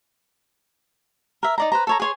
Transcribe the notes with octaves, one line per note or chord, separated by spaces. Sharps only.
A#4 E5
D#4 D5 A#5
B4 C5 A#5
A4 C#5 A#5
G#4 C#5 C6